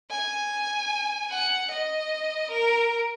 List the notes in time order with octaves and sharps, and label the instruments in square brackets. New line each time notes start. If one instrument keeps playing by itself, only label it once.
[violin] G#5
F#5
D#5
A#4